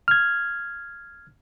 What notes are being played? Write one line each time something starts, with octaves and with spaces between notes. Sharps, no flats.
F6 G#6